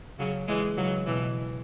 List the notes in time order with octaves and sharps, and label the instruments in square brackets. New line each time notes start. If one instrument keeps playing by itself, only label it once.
[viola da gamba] C#3 F#3
E3 G#3
C#3 F#3
B2 E3